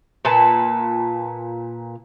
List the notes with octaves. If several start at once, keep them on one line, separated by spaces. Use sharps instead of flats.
A#2 B4 A5